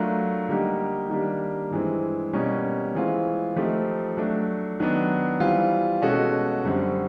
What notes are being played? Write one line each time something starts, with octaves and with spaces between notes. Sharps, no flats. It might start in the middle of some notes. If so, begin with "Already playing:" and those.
Already playing: F#3 A3 D4 F4 A#4
D3 G3 A#3 D#4 G4
D#3 G3 A#3 D4 G4
G2 E3 G#3 C4
B2 G3 A#3 C#4
E3 G#3 C4 F4
F3 A3 C4 D#4 G4
F#3 A3 D4
D#3 F#3 B3 D4
E3 G3 C4 F4
B2 G#3 C#4 F#4 A4
F#2 D3 G3 C4